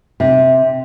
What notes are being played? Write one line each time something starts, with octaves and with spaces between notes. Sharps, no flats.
C3